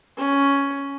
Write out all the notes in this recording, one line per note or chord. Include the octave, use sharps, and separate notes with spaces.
C#4